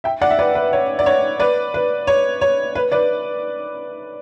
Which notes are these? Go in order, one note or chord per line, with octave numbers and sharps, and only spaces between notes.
E5 G5
D5 F#5
E5
B4 D5
B4
C#5
D5
C#5
B4 D5
B4
C#5
C#5
B4
B4 D5